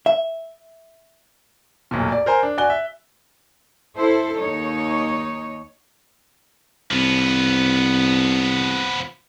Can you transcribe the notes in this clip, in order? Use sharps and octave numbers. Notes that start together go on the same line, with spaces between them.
E5
F1 B1 E2 A#2
D5
A#4 C5 G#5 A#5
D4
F#4 D5 G#5 F#6 G7
E5
E4 A4 C5
D#2 D#4 C#5
C2 F3 B3